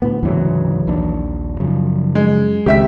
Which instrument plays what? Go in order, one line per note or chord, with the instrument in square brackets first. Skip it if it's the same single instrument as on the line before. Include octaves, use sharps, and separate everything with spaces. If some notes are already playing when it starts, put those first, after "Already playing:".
[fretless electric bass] D2 A2 B3
[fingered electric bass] D2 G#2 C#3 [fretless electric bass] E3 F#3
[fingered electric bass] A#1 D#2 D4
[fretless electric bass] F#2 [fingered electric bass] C#3 F3
[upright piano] G#3
[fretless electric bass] C#2 [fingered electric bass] D#3 G#3 C4 [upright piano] G4 E5 B6